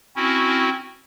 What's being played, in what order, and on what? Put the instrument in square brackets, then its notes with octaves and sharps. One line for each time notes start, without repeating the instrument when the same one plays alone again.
[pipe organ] C4 C#4 E4 F#4